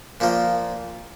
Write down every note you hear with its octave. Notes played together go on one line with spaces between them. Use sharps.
A#2 F3 A#3